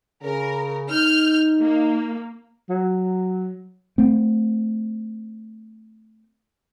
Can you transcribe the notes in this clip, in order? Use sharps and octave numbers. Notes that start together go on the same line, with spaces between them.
C#3 A#4
D#4 F6 G6
A#3
F#3
A3 C4